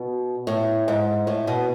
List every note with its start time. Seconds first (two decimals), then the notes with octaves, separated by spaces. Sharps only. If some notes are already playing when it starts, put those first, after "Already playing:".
Already playing: B2
0.47 A2
0.88 G#2
1.27 A2
1.47 B2